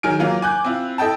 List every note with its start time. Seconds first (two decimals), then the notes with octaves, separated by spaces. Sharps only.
0.03 D#3 F#3 G#4 F6 D7
0.19 E3 F#3 A#3 F4
0.42 G#5 D6 F#6 G6
0.64 C4 E4 F4
0.98 E4 A4 D#5 G5 A5